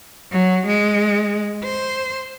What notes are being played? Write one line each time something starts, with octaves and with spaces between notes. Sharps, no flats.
F#3
G#3
C5